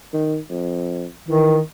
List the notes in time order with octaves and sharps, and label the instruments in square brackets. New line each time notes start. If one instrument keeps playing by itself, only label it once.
[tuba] D#3
F2
[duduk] D#3 [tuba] E3